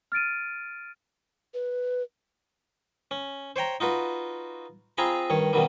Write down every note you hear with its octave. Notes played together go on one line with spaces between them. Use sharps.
F6 A6 D7 D#7
B4
C#4
C5 C#5 G5 A#5
D#4 F4 F#4 B4
C4 F4 G#4 G#5 A#5 B5
G2 D#3 C#5
F#2 B2 D#3 G3